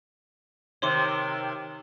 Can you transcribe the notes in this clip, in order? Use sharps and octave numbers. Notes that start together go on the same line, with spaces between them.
C3 D#3 C#5 C6 D6